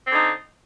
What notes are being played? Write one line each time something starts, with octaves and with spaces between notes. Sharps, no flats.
D3 C4 D#4